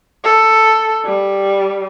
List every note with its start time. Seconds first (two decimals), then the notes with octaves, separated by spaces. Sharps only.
0.24 A4
1.05 G3